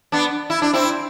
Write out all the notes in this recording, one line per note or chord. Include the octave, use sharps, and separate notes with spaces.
B3 D4
E4
D4
C4 E4